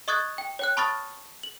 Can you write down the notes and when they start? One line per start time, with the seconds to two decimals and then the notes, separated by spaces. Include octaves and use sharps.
0.08 D#5 C#6 D#6 F#6 G#6 A6
0.38 G5
0.59 C#5 G5 F#6
0.77 A5 B5 C#6 D#6 F6 A6
1.43 F#7